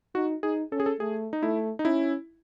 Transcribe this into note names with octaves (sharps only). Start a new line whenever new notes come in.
D#4 F#4
D#4 G#4
C#4 A4
G#4
A4
A3 G#4
D#4
A3 E4
D#4
C#4 E4